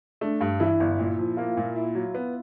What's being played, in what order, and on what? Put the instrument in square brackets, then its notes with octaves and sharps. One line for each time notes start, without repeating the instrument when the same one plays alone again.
[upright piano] A3 [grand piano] D4
[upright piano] G2
[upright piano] E3 [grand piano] E4
[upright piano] G1
A#2
F3
[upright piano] A#3 [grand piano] F4
[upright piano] A#2
E4
F#3
B3